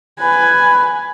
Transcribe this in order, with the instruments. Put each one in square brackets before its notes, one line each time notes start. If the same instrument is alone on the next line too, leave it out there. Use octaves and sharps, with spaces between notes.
[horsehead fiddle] B4 G#5